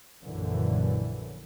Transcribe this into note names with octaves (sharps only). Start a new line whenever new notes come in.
A#1 F#2 D3 E3